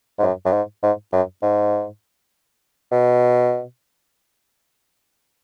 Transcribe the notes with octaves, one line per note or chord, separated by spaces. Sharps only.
G#2
F#2
F#2
G#2
G#2
F#2
G#2
B2